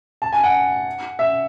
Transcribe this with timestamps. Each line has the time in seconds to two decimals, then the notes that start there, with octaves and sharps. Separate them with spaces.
0.22 A5
0.33 G#5
0.44 F#5
1.19 E5